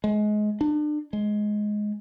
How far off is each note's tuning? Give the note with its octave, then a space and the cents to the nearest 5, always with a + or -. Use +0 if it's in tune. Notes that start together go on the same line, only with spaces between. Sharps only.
G#3 +25
D4 +35
G#3 +10